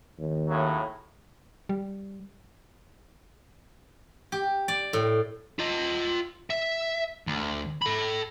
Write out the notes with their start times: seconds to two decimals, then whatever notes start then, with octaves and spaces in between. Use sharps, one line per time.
0.19 D#2
0.48 A2 C#3 F#3
1.69 G3
4.32 G4
4.68 D5
4.93 A2
5.59 F4 D#5
6.50 E5
7.27 D2
7.82 A4 B5